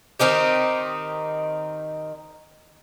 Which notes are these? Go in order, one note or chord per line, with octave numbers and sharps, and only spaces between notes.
D#3 C4 D#4 G4